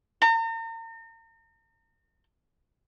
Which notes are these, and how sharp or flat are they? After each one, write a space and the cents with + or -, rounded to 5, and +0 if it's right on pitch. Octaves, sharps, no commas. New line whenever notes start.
A#5 -40